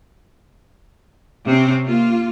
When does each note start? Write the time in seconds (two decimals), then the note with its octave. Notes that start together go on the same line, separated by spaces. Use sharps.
1.46 C3 C4 C#4
1.83 A#3 F4